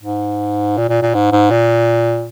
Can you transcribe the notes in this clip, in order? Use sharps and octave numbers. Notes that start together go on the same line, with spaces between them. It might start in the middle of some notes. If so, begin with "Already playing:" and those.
G#2
A#2
A#2
A#2
G#2
G#2
A#2